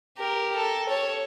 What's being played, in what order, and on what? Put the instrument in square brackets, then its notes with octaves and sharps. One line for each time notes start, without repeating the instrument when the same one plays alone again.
[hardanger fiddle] G4 A#4
A4
C#5